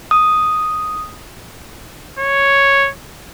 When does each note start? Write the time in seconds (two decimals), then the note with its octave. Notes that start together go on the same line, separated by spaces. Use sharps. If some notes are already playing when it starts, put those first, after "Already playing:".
0.11 D#6
2.19 C#5